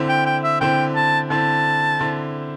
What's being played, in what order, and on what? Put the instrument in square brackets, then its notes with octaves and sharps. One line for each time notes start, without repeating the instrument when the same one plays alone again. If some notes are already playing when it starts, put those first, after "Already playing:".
Already playing: [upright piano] D3 C4 E4
[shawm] G5
G5
E5
[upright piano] D3 C4 E4 [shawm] G5
[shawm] A5
[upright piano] D3 C4 E4 [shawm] A5
[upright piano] D3 C4 E4